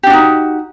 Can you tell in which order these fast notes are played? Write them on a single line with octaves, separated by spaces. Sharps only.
G4 D4 F#4 D#4